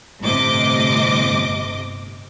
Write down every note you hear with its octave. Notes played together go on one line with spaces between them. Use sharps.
G1 A2 C3 D#5 D6